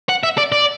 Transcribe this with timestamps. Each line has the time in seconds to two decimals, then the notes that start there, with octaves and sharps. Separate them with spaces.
0.09 F#5
0.23 E5
0.38 D5
0.52 D5